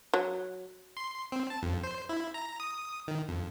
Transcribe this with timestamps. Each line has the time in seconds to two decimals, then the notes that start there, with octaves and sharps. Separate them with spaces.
0.14 F#3
0.97 C6
1.32 C4
1.50 A5
1.63 F2
1.84 C5
2.09 E4
2.34 A#5
2.60 D#6
3.08 D#3
3.28 F2